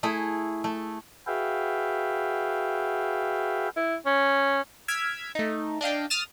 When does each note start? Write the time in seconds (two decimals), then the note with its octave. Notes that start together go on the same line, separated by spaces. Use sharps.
0.03 A3 E4 G#4
0.64 A3
1.27 F#4 G#4 B4 E5 F5 G5
3.76 E4
4.06 C#4
4.88 E6 F6 G#6 B6 D7
5.35 A3 D#4
5.81 D4 D#5 F5 G5
6.10 D#6 F6 A6 E7